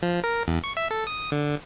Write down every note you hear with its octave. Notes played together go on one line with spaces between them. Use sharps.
F3
A#4
E2
C#6
E5
A4
D#6
D3